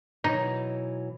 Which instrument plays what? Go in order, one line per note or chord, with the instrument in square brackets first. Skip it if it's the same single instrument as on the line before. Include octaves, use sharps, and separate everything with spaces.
[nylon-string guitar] B2 E3 F#3 [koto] D#4